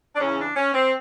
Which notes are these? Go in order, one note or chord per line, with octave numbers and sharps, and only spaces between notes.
D4
E2 C#3 E3 C#4
D4
C#4
C4